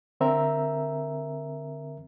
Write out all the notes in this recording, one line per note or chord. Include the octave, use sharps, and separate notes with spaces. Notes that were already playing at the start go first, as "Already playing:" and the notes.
D3 C4 A#4 E5 A#5